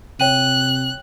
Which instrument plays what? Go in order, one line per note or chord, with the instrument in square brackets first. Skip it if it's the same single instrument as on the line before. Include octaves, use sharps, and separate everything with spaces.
[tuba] C3 [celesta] C#5 G5 D#7 [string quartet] F#6